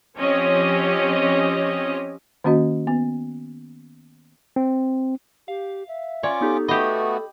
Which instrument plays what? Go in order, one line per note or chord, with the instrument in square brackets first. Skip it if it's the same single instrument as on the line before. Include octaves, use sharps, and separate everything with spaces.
[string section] F3 C4 C#4 G4 C#5 D#5
[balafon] D#3 A#3 C#4 F#4 D#5
B3
[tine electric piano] C4
[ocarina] G4 [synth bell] F5
[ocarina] E5
[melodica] C#4 F4 D6 [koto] C#5 [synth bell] D5
[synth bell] B3 D#4 G4 [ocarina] A4
[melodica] A3 B3 F#4 [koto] G4 D#5 [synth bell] B5 D#6